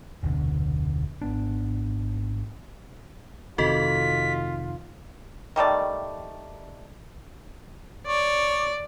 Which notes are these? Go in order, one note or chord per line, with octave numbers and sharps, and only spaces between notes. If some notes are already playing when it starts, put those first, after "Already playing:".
F1 D2 B2 D3
G#1 B3 D4
F1 C3 D#3 F4 F#4 A4 D#5 B6
D#3 G3 A3 D5
C#5 D5